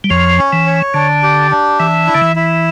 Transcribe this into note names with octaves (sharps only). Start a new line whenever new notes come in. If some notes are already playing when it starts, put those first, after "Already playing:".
G3
F2 F3 C#5
C#4
E3
C#5
D3 D4
G4
D4
E3 E5
E4
D3
E3
E4